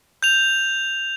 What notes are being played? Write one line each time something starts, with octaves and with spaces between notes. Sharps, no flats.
G6 F7